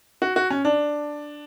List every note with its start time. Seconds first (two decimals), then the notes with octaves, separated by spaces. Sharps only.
0.22 F#4
0.36 F#4
0.50 C#4
0.65 D4